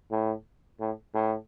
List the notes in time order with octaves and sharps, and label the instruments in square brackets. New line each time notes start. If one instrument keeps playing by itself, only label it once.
[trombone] A2
A2
A2